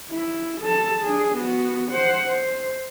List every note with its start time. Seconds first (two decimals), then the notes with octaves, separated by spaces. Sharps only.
0.11 E4
0.61 A4 A5
1.03 D4 G#4
1.34 B3 F#4
1.91 C5 F#5
2.29 C5